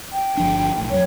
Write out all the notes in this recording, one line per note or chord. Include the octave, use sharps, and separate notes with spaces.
G5
G1 F3 D4
B1 A2
F2 F#3 C#5